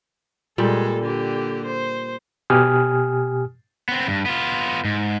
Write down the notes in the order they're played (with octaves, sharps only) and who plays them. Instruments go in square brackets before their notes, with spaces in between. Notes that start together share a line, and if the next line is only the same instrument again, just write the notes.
[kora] A#2 G3 [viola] G#3 A4
[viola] D3 G4
C5
[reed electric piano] B2 G4 G#5 D#6 F6
[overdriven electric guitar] B3 C4
G2
B3 F4
G#2